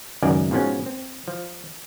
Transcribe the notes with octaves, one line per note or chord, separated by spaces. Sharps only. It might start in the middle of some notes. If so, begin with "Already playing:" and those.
C#2 F#2 D#3 D5 G#5
G#2 B2 F3 B3 C#4
C4
F3